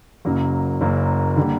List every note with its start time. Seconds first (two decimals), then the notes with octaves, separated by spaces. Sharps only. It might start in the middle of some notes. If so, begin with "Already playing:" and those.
0.25 F#1 F#2 C#3 F#3 A#3
0.81 F#1 F#2 C#3 F#3 A#3
1.37 D3 G3 A#3